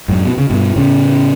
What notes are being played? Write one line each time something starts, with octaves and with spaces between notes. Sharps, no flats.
F#2 A2
B2
C#3
G2 B2
A2 C#3